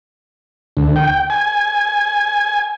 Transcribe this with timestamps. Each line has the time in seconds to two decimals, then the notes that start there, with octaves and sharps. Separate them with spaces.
0.77 D2
0.96 G5
1.30 G#5